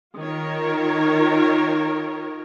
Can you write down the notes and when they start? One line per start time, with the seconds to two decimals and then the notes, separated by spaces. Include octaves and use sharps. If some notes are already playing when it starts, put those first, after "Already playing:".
0.15 D#3 F4 A#4 C#5